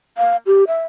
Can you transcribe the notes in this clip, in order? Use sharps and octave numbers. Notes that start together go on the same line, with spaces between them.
F5
G4
E5